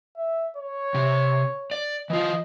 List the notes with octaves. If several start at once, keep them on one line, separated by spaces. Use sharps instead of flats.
E5
C#5
C3
D5
E3 F4 D#5